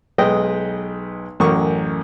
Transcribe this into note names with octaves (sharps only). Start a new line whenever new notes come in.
B1 G#3 B4 D#5 G5
A1 F#2 A#4 C#6 D6